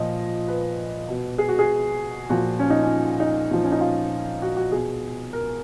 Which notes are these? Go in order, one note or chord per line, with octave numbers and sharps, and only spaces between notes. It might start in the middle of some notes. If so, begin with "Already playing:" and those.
Already playing: A#2 F3 D#5
B4
B2
G#4
F#4
G#4
A#2 F3 F#4
C#4
D#4
C#4
D#4
A#2 F3
C#4
D#4
F4
F#4
F#4
B2 G#4
A#4